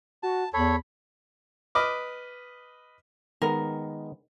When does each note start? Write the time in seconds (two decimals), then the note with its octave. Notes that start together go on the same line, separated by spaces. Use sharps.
0.23 F#4 A5
0.54 E2 A4 C#5 B5
1.75 B4 D#5 D6 F6
3.42 D#3 G#3 B3 A#4